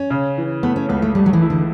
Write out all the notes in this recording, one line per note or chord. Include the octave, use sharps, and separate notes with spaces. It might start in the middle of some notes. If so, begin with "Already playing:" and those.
Already playing: C#4
C#3
E3
A3 B3
C#4
C#2 B3
A3
G3 A3
F#3
E3
E4
D3